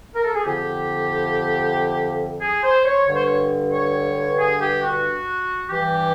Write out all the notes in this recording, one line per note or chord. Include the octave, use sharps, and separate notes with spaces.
A#4
A4
G#4
F2 D3 G4
G#4
C5
C#5
G2 D3 C#5
C5
C#5
C#5
G#4
G4
F#4
G2 E3 G4